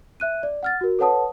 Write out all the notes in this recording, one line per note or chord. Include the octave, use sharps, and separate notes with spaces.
E5 F#6 D#7
D5
F#5 F6 A6
F#4 A#4
A4 B4 C#5 F#5 A5 D#6